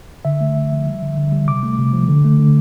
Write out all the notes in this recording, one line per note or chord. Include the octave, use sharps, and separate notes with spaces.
D3 E5
A3
D3
F3
G3
D3
D3
G3
C3 D6
A3
C3
F3
D3
A3
D3